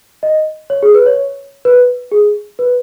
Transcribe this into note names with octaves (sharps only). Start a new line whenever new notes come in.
D#5
C#5
G#4
B4
C#5
B4
G#4
B4